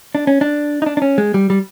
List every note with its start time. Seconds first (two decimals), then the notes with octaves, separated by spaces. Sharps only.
0.15 D4
0.27 C#4
0.41 D4
0.82 D#4
0.86 D4
0.97 D4
1.02 C#4
1.18 G#3
1.34 G3
1.50 G3